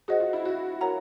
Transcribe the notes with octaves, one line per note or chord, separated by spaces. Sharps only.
F#4 G#4 C5 D#5 F#5
F4
E4
F#4
A#4 C#5 F#5 A#5